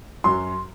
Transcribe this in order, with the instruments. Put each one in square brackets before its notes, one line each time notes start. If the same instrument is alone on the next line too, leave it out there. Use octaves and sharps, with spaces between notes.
[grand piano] F#2 F#3 C6